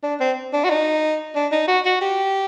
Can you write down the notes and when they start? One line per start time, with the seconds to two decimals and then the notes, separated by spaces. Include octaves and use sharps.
0.03 D4
0.20 C4
0.53 D4
0.65 F#4
0.70 D#4
1.36 D4
1.52 D#4
1.68 F#4
1.85 F#4
2.02 G4